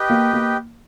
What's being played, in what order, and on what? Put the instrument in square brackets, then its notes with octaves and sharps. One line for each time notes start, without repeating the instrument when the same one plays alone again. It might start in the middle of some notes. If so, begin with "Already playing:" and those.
Already playing: [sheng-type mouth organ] G4 B4 D#5 G5
[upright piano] A#3
A#3